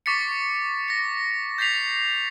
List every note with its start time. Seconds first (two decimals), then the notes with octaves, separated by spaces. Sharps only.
0.06 C#6 D6 A6 B6 C#7
0.88 A#6 C#7
1.58 G6 A6 B6 C7 F7